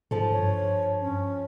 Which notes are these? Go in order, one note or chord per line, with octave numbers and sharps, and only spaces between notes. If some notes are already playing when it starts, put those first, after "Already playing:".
G#2 F3 A4
G2 C#5
C#4